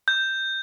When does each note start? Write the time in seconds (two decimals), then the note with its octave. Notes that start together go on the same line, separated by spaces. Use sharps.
0.08 G6